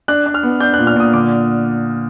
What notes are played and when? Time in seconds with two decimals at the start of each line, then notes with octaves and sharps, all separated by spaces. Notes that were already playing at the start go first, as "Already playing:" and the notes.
0.08 D4 F#6
0.26 D4
0.34 F6
0.43 B3
0.60 D4 G6
0.74 F#6
0.78 A#2
0.87 F6
0.96 A#2 D#6
1.13 D3 D6